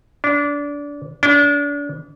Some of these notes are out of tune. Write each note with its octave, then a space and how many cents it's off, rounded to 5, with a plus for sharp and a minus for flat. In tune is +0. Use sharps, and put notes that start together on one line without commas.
D4 -25
D4 -35